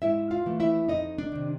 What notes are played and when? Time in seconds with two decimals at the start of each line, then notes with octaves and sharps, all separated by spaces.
0.02 G#2 E4 E5
0.31 F4 F5
0.46 E3 A3
0.60 E4 E5
0.89 F2 D#4 D#5
1.18 D4 D5
1.32 C3 D#3